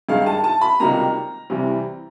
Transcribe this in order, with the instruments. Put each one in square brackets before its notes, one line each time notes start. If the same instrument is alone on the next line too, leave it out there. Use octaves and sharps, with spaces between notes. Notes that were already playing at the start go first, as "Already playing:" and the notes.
[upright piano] G2 D#3 G#3 F5
A5
A5
B5
C#2 C3 D#3 G3 A#3 A#5
C2 C3 E3 G3 C4